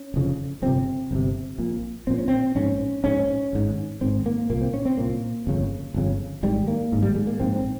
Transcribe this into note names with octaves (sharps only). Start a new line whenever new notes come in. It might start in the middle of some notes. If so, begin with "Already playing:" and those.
Already playing: C#4
F1 F2 C#3
G1 F2 C3 C4
G1 F2 C3
A#1 A#2
A#1 A#2 C4
C#4
C4
A#1 G#2 C#4
A#1 G#2 C#4
G#1 G#2
G#1 G#2 C4
A#3
C2 A#2 A#3
C4
C#4
C4
C2 A#2 A#3
G1 F2 C#3
G1 F2 C#3
G#1 G#2 G3
A#3
G#1 G#2
G3
G#3
A#3
A#1 G#2 C4
C4